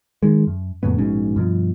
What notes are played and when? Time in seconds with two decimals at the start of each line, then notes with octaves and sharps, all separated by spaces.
0.23 D#3 G#3
0.47 F#2
0.83 F2 A2 C#3 B3
0.98 A#1 G#2 B2 C#4
1.36 G2 B2 F3